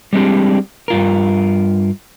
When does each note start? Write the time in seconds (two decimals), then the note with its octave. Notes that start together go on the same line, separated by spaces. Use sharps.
0.13 G3 G#3 C4 D4 G4
0.88 G2 F4 A#4